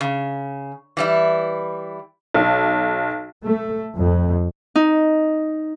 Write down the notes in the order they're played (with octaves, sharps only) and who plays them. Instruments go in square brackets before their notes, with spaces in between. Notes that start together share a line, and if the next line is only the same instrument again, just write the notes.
[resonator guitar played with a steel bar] C#3
E3 G3 E4
[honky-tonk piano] B1
[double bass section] A3
F2
[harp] D#4